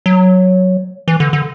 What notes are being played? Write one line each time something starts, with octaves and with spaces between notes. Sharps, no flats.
F#3
E3
D3
D3